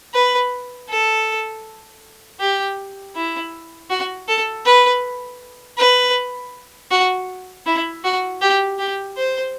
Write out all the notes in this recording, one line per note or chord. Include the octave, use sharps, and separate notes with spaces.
B4
A4
G4
E4
F#4
A4
B4
B4
F#4
E4
F#4
G4
G4
C5